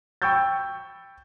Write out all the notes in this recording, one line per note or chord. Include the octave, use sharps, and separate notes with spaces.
G5 B5 C#6 E6 G6 A6